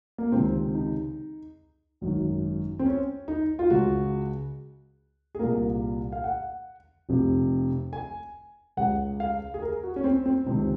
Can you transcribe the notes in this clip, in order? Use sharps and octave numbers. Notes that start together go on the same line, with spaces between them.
A#3
C#2 C3 D#3 C4
D#4
G#1 F#2 D#3
C4
C#4
D#4
F4
C#2 C#3 F#4
G#4
C2 A#2 A#4
F5
F#5
F1 F2 C3
G#5
C#2 C#3 F#5
F5
G#4
A#4
F#4
C#4
C4
C4
C#2 C3 D#3 C4